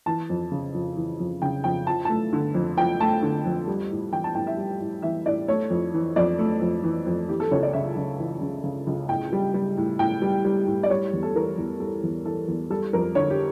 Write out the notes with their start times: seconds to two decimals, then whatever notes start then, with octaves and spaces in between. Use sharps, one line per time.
0.06 E3 A5
0.29 F2
0.51 C#3
0.74 F2
0.97 E3
1.20 F2
1.42 C#3 G5
1.64 F2 G5
1.87 F3 A5
2.05 A3 A5
2.33 D3
2.54 F2
2.77 F3 G5
3.00 A3 A5
3.23 D3
3.45 F2
3.68 G3
3.91 A2
4.12 E3 G5
4.24 A5
4.35 A2 G5
4.47 E5
4.57 G3
4.81 A2
5.02 E3 E5
5.26 A2 D5
5.48 A3 C#5
5.70 F2
5.94 E3
6.16 F2 D5
6.39 A3
6.61 F2
6.84 E3
7.06 F2
7.29 E3 G4
7.40 A4
7.51 C#2 C#5
7.63 D5
7.73 C#3 E5
7.96 C#2
8.19 E3
8.41 C#2
8.64 C#3
8.87 C#2
9.09 A2 G5
9.33 G3
9.54 G3
9.78 A2
9.99 A2 G5
10.22 G3
10.45 G3
10.67 A2
10.83 D5
10.90 G3 C#5
11.13 E2
11.23 A4
11.35 E3 A#4
11.57 E2
11.80 G3 A4
12.03 E2
12.25 E3 A4
12.48 E2
12.70 G3 A4
12.93 F2 A#4
13.15 D3 C#5
13.30 G4